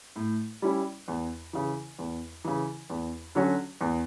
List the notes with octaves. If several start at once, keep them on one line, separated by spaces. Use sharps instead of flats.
A2
G3 C#4 E4
E2
C#3 E3
E2
C#3 E3
E2
D3 F#3 C#4 F#4
E2